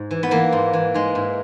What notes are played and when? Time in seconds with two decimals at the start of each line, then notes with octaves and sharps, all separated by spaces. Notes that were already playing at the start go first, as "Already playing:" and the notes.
Already playing: G#2
0.11 E3
0.23 B3
0.31 E3 A#3
0.52 G#2
0.73 E3
0.94 G#2 G#3
1.15 G#2